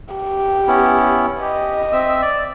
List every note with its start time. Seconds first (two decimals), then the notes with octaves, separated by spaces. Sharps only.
0.15 G4
0.68 B3 C#4 E4
1.41 G4 D#5
1.92 C4 E5 E6
2.22 D5